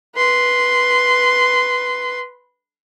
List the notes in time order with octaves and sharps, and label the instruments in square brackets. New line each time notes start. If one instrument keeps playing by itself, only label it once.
[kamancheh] B4 C6